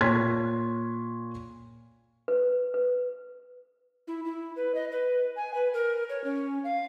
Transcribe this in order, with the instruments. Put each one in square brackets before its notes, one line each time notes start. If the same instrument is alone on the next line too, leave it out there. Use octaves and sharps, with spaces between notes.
[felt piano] A#2 C#5 C6 G#6 B6
[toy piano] B4
B4
[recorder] E4
E4
B4
D#5
B4
G#5
B4
A#4
C#5
C#4
F5